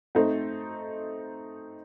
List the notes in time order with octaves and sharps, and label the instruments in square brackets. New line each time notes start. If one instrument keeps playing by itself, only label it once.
[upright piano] A3 C4 D#4 A4 C5